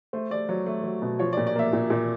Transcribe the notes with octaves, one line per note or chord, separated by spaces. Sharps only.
A3 C5
A3 D5
F#3 C#5
A3
F#3
B2
F3 C#5
D5
A#2
D5
A#3 E5
A#2
A#2